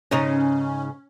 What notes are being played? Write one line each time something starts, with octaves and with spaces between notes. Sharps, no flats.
G#2 C#3 C#4 D#4